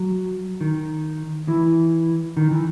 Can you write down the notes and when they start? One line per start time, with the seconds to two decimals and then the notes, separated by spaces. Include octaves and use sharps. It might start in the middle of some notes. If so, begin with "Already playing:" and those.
Already playing: F#3
0.61 D#3
1.48 E3
2.37 D#3
2.51 E3